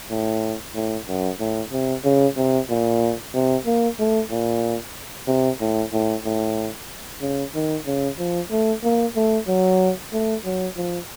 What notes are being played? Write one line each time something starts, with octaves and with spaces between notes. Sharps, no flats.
A2
A2
F#2
A2
C3
C#3
C3
A#2
C3
A#3
A3
A#2
C3
A2
A2
A2
C#3
D#3
C#3
F3
A3
A#3
A3
F#3
A3
F#3
F3